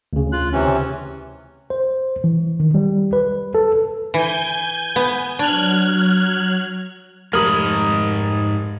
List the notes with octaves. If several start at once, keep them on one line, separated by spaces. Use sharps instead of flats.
D2 C#3
F4 F#6
C3 E3 C#4
C5
E3
D#3
G3
B4
A4
E3 G#5 G6
B3
F#3 D4 F6 F#6 G#6
F1 G#2 A#4 B5 D#6 F6 G#6